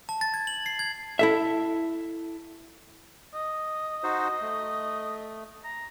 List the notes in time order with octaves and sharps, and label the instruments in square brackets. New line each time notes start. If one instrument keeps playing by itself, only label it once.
[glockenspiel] A5
A6
G#6
F#7
C7
G#6
[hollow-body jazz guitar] E4 A4 E5
[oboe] D#5
[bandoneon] D#4 F#4 C5
A3
[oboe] A#5